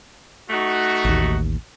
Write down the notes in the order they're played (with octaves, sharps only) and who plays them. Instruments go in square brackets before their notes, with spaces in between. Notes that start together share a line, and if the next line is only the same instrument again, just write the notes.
[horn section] A3 D#4 F#4
[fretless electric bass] A1 D#2